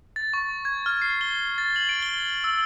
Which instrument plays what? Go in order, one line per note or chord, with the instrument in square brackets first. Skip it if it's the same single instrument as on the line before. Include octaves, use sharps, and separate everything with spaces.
[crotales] A6
C#6
G#6
F6
C7
G7
A6
F#7
D7
G7
E6